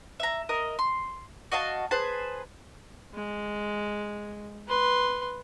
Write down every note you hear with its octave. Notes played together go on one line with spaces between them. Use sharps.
E5 A#5
A#4 D#5 D#6
C6
F#4 D#5 F5 A5
G#4 B4 C5 A5
G#3
B4 C6